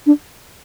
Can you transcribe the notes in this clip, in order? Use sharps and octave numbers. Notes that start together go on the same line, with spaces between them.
D4